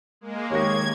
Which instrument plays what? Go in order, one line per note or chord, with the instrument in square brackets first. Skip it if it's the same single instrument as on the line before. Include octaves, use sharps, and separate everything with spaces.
[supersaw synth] G#3 A#3
[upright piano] G#1 A#4 A#6 [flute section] G4 C#5 C#6 [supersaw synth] G#6